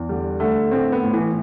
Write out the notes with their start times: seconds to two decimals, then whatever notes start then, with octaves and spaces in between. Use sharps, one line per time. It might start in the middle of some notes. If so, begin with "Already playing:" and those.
Already playing: E2
0.09 D3 G3
0.40 D3 A3
0.71 A2 C4
0.92 B3
1.04 A2
1.13 E3